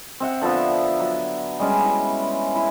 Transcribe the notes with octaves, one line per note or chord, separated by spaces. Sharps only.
C4 E5 F#5
D3 F3 B3 E5
F#3
G3 G#3 C#4
E4
E4